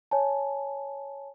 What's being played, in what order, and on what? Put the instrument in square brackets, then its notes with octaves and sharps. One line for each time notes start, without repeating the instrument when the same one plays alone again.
[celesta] C#5 G#5 A5